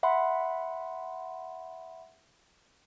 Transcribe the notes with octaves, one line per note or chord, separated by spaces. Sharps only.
E5 F#5 B5 C6